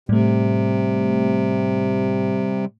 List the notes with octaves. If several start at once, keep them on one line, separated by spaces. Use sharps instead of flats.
A2 C3 G3 A3